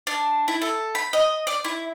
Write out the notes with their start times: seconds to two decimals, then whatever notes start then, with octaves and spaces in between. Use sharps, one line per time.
0.07 D4
0.48 E4
0.62 A4
0.95 B5
1.13 D#5
1.47 D5
1.65 E4